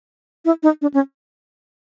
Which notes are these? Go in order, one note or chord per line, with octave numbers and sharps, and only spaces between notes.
E4
D#4
D4
C#4